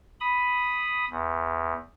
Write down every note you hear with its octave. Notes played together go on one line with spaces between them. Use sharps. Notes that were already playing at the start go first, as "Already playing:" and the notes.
B5 D#6
E2